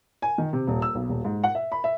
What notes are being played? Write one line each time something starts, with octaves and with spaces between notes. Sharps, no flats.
G#5
D#3
C3
D#1
E6
B1
D#1
G#2
F#5
E5
B5
E5